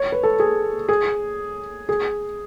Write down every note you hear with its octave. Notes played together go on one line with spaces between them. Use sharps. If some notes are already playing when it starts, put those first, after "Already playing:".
Already playing: C#5
B4
A4
G#4
G#4
G#4